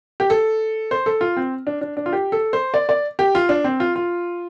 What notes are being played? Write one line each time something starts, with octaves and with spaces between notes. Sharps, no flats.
G4
A4
C5
A4
F4
C4
D4
D4
D4
F4
G4
A4
C5
D5
D5
G4
F4
D4
C4
F4
F4